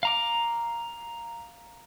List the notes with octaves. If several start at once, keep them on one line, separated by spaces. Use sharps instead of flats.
F5 A#5 D6